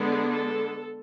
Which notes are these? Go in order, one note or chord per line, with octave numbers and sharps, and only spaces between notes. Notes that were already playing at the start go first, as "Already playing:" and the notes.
Already playing: D3 G#3 B3 D4
A4